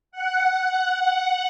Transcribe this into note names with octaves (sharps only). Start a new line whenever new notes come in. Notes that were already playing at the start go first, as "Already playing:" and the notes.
F#5